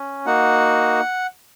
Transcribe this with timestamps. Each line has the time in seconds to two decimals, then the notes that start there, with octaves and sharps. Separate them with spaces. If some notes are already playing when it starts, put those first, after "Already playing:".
Already playing: C#4
0.26 A#3 D#4 F#4 F#5